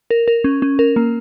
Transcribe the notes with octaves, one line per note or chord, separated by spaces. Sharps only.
A#4
A#4
C#4
C#4
A#4
A#3